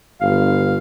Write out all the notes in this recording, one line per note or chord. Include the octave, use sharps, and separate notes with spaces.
G1 F5